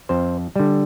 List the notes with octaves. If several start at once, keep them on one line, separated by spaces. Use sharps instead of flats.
F2 C5
D3 G3